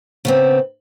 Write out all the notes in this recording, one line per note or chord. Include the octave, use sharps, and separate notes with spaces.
C#3 B3 C4